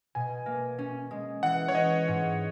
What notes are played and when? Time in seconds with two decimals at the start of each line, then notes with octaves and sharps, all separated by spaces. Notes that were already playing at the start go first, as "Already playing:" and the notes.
0.15 B2 G#5
0.46 A#3
0.79 C#4
1.11 G#3
1.43 E3 F#5
1.68 C#5
1.75 C#4 D#5
2.07 G#2